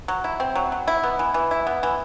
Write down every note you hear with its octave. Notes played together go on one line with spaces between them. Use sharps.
F#3
E4
C4
F#3
F#3
E4
B3
E3
E3
E4
B3
E3